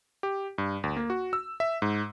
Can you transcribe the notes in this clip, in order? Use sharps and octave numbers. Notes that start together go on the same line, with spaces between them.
G4
G2
D2
A#3
F#4
E6
E5
G#2